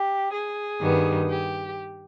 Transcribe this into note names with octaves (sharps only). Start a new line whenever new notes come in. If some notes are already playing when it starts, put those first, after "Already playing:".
Already playing: G4
G#4
G2 D#3 G3 B3
G4